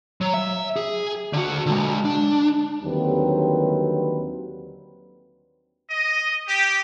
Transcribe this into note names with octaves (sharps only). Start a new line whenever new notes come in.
F#3
E5
G#4
D3 F#4
D3 G#3
D4
D#2 D3 F#3 G3 C4 B4
D#5
G4